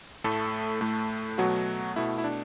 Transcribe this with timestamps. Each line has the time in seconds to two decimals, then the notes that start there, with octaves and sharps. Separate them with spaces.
0.24 A2 A3 A4
0.81 A2 A3
1.38 B2 F#3 A3 F#4
1.96 B2 A3 E4
2.18 E4
2.24 D4